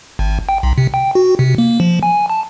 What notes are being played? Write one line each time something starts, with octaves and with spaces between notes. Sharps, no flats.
G#1
G5
B1
C3
G5
F#4
C3
A#3
F3
G#5
A5